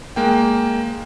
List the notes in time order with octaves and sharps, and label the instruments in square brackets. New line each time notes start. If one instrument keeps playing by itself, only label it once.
[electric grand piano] G#3 A#3 G5